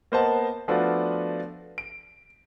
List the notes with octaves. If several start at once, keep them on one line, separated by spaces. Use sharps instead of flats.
A#3 B3 C5 D#5 F#5 A5
F3 A3 B3 D4 F4 F#4
D7